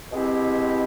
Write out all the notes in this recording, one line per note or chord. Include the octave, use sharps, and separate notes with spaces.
B2 G#3 C4 E4 G4